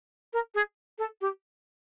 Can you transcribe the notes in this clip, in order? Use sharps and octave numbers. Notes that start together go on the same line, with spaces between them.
A#4
G#4
A4
G4